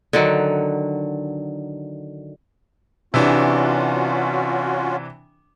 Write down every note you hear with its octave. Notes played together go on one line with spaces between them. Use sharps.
D3 D#3 F#3
C3 E3 C#4 D4 F4 F#4